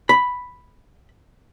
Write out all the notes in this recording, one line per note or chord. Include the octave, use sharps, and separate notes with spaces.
B5